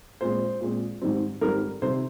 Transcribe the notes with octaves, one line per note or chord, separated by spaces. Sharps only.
A#2 G#3 C4 C5
A#2 G#3 C4
G#2 D#3 G3 C4
G#2 D#3 G3 C4 A#4
C3 D#3 G3 C4 C5